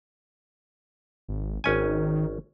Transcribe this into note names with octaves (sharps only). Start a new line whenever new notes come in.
G#1
G#1 D#3 C#4 G#5